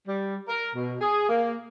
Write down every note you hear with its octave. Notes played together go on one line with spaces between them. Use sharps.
G3
A#4
B2
G#4
A#3